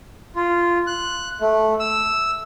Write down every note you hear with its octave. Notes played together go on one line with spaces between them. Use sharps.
F4
F#6
A3
E6